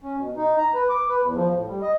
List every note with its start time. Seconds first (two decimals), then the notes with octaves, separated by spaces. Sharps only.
0.03 C#4
0.18 B2
0.37 D#4
0.58 A#5
0.74 B4
0.89 D6
1.09 B4
1.23 E2
1.35 F3
1.53 A2
1.68 G3
1.82 D#5